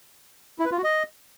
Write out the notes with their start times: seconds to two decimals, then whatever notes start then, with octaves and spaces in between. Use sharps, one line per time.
0.59 E4
0.65 B4
0.72 F4
0.78 F#4
0.84 D#5